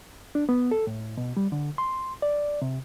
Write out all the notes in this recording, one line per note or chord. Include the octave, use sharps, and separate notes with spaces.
D4
B3
A4
A2
B2
G3
D3
C6
D5
C3